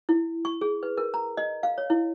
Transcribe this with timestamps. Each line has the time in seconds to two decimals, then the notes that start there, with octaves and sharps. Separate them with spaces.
0.09 E4
0.45 C#6
0.61 G#4
0.83 B4
0.97 A#4
1.14 A#5
1.37 D#5
1.63 F5
1.78 C#5
1.90 E4